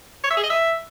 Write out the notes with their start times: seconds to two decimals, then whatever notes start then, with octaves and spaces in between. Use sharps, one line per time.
0.24 C#5
0.31 E5
0.37 G#4
0.44 D#5
0.50 E5